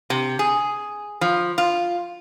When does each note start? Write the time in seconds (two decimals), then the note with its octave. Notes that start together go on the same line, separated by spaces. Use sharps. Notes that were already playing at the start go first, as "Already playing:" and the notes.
0.10 C3
0.39 G#4
1.21 F3
1.58 F4